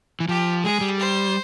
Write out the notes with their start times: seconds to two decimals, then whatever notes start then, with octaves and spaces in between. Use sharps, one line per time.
0.20 E3
0.29 F3 G4
0.64 G#3 G#4
0.81 G3
0.99 C5